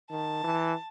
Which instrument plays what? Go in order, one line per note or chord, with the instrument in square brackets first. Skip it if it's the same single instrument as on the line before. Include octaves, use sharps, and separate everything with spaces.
[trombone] D#3 [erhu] A5
[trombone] E3